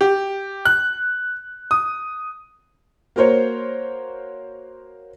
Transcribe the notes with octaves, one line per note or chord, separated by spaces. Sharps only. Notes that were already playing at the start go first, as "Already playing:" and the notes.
G4
F#6
D#6
A#3 F#4 A#4 C5 C#5